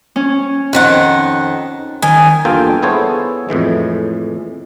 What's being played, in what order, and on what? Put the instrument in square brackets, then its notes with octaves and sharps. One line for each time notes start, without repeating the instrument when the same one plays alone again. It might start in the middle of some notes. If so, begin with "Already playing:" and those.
[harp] C#4
[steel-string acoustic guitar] F2 D#3 F#5
[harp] D#3 [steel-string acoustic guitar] G#5
[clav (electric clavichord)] E2 G2 A#3 F4 A4 G5
B3 E4 G#4 A4 C5 C#5
F2 A2 E3 G#3